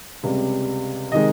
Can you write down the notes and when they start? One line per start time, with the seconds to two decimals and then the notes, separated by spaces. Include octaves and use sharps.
0.23 C#2 C3 G3
1.12 C3 D#3 G#3 D#5